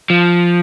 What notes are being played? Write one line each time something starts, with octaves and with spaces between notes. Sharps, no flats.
F3